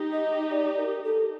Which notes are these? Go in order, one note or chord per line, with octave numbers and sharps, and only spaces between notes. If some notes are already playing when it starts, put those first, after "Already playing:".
Already playing: D#4 G4
D#5
D5
A#4
A4